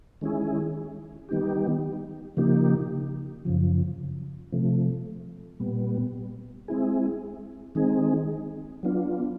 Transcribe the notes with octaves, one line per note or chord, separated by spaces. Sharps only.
D#3 G#3 C#4 E4 G#4
D#3 G3 B3 D#4 G4
C#3 F3 A#3 D#4 G4
F#2 C#3 F3
C3 F3 A3
A#2 G3 B3
G#3 C4 E4 G#4
D#3 G#3 C4 D#4 G#4
F#3 B3 D4 F4